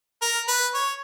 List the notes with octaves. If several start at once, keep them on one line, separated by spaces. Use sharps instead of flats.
A#4
B4
C#5